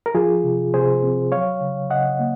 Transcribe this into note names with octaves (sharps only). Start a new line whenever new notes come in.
A#4
F3 F4 G#4
C3
C3 G#4 C5
C4
F#3 C#5 F5
C#3
C#3 D#5 F#5
A#3